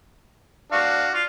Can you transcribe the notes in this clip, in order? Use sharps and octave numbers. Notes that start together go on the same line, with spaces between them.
D4 F#4 F5
F4